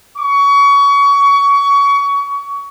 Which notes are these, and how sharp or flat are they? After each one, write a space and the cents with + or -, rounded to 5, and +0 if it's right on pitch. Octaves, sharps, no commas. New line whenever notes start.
C#6 +25